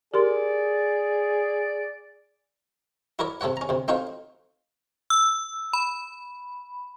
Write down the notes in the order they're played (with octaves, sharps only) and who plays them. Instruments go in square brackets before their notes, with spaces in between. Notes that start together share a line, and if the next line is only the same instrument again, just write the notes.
[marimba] G4 A#4 C6 [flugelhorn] G#4 [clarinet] D5
[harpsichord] E4 F#4 A#4 C#5 D5
C3 A3 A4 C#5 F#5
C#4 A#5
D2 C3
A3 C4 D#4 F#4 C#5 F5
[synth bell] E6
B5